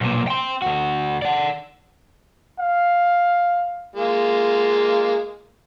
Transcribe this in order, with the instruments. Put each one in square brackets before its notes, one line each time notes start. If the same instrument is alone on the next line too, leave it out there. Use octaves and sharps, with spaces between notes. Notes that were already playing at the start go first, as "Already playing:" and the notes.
[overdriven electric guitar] B1 A#2
G5 C6
D2 F#4
D5 F#5
[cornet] F5
[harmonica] G#3 A#3 F4